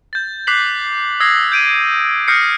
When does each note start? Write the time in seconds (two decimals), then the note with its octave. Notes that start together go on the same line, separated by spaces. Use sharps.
0.13 G6 A6
0.47 D6 F#6 B6 C7 F#7
1.20 D#6 E6 G#6 A#6 C7
1.52 G6 D7 D#7
2.28 D#6 F6 G6 A#6 C7 C#7